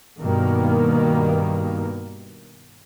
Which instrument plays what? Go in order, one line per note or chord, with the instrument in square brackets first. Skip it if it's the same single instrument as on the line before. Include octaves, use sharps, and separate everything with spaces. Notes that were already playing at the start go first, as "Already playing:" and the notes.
[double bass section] G2 B2 D#3 A#3